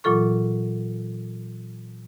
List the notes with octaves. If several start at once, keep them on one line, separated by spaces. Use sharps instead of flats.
A#2 E3 F#3 F4 A4 C#6